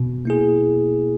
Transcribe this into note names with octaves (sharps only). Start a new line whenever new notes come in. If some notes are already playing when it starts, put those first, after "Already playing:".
Already playing: B2
A#3 E4 G#4